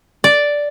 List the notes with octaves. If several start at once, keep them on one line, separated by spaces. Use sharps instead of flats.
D5